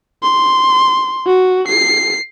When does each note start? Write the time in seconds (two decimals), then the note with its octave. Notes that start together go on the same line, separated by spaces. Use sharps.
0.23 C6
1.27 F#4
1.68 C7